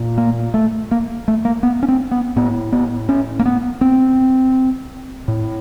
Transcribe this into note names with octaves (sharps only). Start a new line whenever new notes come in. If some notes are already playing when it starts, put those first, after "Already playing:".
Already playing: A#2
A#3
A3
A#3
A3
A#3
B3
C#4
C4
B3
A2 B3
B3
C#4
A#3
B3
C4
A2